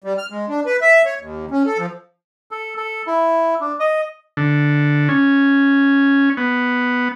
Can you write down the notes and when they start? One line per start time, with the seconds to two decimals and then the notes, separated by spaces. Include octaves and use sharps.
0.04 G3
0.18 F6
0.30 G#3
0.49 D4
0.66 B4
0.82 E5
1.06 C#5
1.20 D#2
1.51 C#4
1.66 A4
1.78 F3
2.51 A4
2.77 A4
3.07 E4
3.61 D4
3.80 D#5
4.37 D3
5.09 C#4
6.37 B3